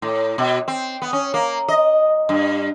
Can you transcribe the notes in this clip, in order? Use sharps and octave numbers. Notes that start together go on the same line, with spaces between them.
A2
B2
C4
B3
C#4
A#3
D#5
G2